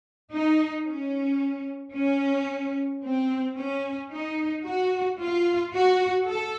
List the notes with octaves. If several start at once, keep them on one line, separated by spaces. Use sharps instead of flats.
D#4
C#4
C#4
C4
C#4
D#4
F#4
F4
F#4
A4